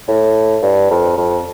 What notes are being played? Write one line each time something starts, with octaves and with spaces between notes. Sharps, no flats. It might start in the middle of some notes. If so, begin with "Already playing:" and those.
A2
G2
F2
F2